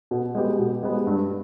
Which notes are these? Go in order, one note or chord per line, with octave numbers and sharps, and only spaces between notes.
B2
G#3 B3 G4
B2
G#3 B3 G4
G2